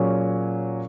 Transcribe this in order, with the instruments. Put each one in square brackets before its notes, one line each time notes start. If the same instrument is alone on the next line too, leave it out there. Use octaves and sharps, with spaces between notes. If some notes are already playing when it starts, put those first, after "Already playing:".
Already playing: [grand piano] A#2 F#3 C#4 G#4